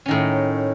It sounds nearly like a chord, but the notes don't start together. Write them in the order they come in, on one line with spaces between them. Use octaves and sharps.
C#4 D#3 A2